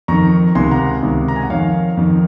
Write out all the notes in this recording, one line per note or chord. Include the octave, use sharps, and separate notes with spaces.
F2 D#3 A#5 C#6
C#2 C3 D#3 G#5 C6
F#5 A#5
C#2 C3 D#3
A#5
G#5
F#5
F2 D#3 C#5 F5
F2 D#3